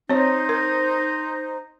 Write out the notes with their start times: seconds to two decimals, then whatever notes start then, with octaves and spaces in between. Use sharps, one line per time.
0.10 C4 D#4 C5 C#5
0.49 A#4